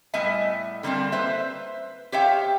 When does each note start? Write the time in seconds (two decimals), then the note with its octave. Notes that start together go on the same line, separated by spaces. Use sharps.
0.14 A2 G3 B3 D#5 E5 G#5
0.83 D3 G3 A#3 C4 D4
1.12 B4 C5 E5
2.12 G4 C5 C#5 E5 F5 G5